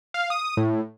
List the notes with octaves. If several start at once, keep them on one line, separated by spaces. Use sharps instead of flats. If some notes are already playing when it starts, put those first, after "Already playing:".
F5
D#6
A2